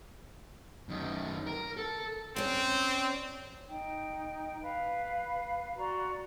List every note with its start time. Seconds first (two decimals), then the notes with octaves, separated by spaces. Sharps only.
0.89 F#2 D#3
1.47 A#4
1.77 A4
2.36 C4 C#4 D5
3.68 D#4 G5
4.63 B4 F5
5.78 F#4 D5 A#5 C6